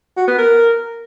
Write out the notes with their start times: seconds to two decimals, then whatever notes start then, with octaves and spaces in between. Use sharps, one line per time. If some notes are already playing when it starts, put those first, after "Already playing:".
0.17 F#4
0.27 B3
0.38 A#4